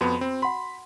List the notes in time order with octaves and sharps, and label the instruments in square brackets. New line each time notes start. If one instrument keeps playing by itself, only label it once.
[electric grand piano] F2 B3 [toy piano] F#4 B5
[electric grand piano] C4
[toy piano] F#5 C6 [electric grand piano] B5